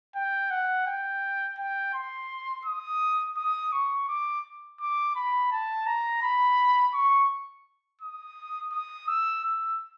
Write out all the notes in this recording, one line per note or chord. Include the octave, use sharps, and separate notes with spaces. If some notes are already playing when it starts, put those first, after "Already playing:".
G5
F#5
G5
G5
C6
D#6
D#6
C#6
D6
D6
B5
A5
A#5
B5
C#6
D#6
D#6
E6
E6